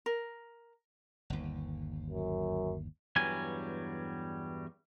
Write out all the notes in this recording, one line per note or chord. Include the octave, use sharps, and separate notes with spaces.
A#4
G1 D#2
F#2
E2 G2 F#3 G3 G#5